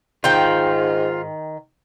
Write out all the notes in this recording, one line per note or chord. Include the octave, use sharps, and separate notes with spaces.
G#2 D#3 F4 G5